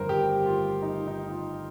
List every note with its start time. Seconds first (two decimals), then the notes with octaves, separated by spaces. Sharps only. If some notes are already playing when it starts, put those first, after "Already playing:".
Already playing: G1 F2 D#3 G3 A#4 C5
0.09 G4
0.46 F4
0.82 D#4
1.07 D#4
1.32 F4